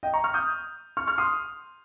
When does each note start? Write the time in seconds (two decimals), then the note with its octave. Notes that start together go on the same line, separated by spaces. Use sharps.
0.03 D#5 G5
0.13 A#5 C#6
0.24 C#6 F6
0.34 D#6 G6
0.97 C#6 F6
1.07 C#6 F6
1.18 C6 D#6